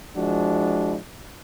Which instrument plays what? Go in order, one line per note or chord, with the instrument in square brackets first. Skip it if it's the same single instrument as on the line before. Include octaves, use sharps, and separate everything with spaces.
[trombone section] F3 G#3 D4 E4 F#4